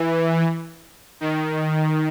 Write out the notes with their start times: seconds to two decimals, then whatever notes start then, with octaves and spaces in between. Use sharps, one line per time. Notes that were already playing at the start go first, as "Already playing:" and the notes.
Already playing: E3
1.21 D#3